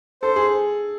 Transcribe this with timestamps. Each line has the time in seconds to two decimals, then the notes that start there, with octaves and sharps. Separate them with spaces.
0.22 A4 C5
0.36 G#4